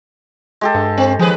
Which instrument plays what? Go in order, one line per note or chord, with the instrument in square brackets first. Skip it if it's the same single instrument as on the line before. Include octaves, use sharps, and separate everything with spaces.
[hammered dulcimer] G#3 G4 A4
[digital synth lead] G2
[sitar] C4
[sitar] D#2 G#4 B4 [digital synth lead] F3